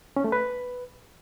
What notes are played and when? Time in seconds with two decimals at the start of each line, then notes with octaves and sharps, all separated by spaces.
0.16 C#4
0.24 A3
0.32 B4